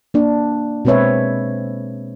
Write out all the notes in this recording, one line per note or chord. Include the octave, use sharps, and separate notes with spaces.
A#3 D4
B2 G#3 C4 B4 C#5 E5